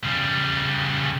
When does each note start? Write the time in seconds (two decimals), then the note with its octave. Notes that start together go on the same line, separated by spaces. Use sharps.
0.04 C#3 G3